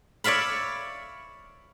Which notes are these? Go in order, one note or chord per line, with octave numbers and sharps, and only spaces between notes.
C#5 D5 E5 F5 B5